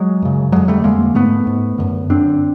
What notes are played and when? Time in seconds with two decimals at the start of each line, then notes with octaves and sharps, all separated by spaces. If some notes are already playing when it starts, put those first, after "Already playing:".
Already playing: F#3 G#3
0.22 F#2 C#3
0.52 F2 D3 F#3 G#3
0.68 G3 A3
0.84 F2 D3 G#3 A#3
1.15 G#2 A3 B3
1.47 G#2
1.78 F#2 D3
2.10 F#2 D3 C4 D4